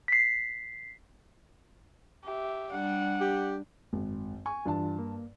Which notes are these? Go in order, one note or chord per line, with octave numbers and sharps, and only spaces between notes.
B6 C7
G4 E5
G3 D4 F#5
G4
G#1 F#2
G#5 C#6
G2 E3 D4 F4 A5
A#3